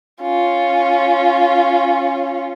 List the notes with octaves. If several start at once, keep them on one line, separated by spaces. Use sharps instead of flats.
C#4 F4